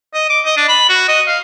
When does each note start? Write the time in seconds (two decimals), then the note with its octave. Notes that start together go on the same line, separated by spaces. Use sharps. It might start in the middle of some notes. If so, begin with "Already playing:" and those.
0.14 D#5
0.30 D6
0.45 D#5
0.57 D4
0.68 B5
0.89 F#4
1.09 D#5
1.27 F5